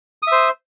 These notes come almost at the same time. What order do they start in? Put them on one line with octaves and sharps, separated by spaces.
D#6 E5 C5